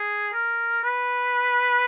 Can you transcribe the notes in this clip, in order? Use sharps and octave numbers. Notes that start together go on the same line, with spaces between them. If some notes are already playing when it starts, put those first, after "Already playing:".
Already playing: G#4
A#4
B4